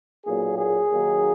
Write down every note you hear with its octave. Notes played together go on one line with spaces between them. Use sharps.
B1 A#2 F#3 A#3 G#4
G#4
D#2 D#3 F#3 A#3